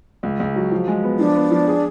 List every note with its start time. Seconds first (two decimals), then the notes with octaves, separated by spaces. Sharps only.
0.23 C#2
0.40 C#2
0.56 F#3
0.72 F3
0.88 G#3
1.04 B3
1.19 F3 D4
1.35 B3
1.51 F3
1.67 G#4